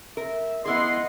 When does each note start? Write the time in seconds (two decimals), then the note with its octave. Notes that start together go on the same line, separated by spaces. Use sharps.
0.17 A#4 E5
0.65 B3 E4 G#4 D#5 F#5 C6